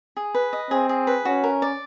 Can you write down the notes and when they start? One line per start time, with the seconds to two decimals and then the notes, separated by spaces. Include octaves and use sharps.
0.17 G#4
0.35 B4
0.53 D#5
0.71 C4 G#4
0.89 G#4
1.07 B4
1.25 C#4 F#4
1.44 A#4
1.62 D5